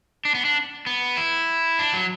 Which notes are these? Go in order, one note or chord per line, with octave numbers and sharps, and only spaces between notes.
D4
B3
D4
B3
E4
D4
F#3